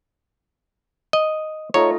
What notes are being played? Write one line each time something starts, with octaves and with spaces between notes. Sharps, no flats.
D#5
A3 D#4 F4 C#5